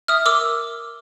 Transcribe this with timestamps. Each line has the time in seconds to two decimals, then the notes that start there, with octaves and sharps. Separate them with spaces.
0.08 E5 D#6 F6
0.26 A#4 D6 E6